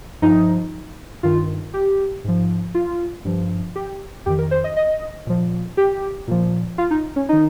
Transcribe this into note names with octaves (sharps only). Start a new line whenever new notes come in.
G2 F3 D#4
G2 D#3 F4
G4
G#2 F3
F4
G2 F3
G4
F2 D#3 G4
A#4
C5
D#5
D#5
A#2 F3
G4
A#2 F3
F4
D#4
C#4
D#3 D#4